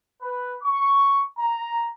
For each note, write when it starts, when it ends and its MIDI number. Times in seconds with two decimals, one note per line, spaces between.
0.22 0.57 71
0.63 1.24 85
1.39 1.90 82